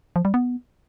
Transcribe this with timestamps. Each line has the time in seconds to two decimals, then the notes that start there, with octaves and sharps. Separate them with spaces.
0.16 F3
0.25 G3
0.34 B3